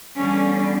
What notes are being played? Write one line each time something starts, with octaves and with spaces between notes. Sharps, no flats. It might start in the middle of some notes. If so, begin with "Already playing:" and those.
E2 D3 G3 C#4